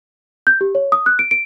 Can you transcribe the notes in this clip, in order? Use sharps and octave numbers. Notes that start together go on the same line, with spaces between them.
G6
G4
C#5
D#6
F#6
D7
D7